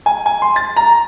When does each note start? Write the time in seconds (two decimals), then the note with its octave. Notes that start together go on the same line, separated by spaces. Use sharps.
0.06 G#5
0.26 G#5
0.42 C6
0.56 A6
0.76 A#5